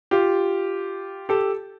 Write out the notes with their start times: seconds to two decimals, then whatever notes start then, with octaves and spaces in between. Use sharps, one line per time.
0.11 F4 G4
1.29 G4 A4